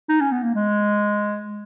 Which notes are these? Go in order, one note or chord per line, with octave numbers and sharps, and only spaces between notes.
D#4
C#4
B3
A#3
G#3